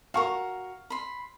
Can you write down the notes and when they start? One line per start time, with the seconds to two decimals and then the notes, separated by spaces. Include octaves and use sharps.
0.14 F#4 A#4 F5 C#6
0.90 B5 C6